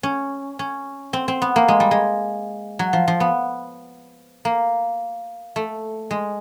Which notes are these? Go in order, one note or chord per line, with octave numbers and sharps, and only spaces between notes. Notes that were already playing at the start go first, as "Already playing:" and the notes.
C#4
C#4
C4
C4
B3
A#3
G#3
G3
G#3
F#3
F3
F3
B3
A#3
A3
G#3